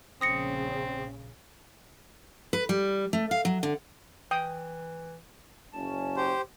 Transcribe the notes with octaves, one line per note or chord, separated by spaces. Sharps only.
A#1 C#3 C4 D#6 A#6 C#7
B4
G3
A3
F5
F#3
D3
E3 G5 D#6
F#1 C#4 A5
G4 C5